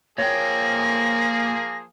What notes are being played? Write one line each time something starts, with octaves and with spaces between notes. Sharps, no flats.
A#2 F3 A#3 G#4 C#5 G5 A#6